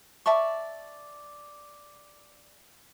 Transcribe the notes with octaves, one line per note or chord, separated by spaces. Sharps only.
D5 E5 A5 C#6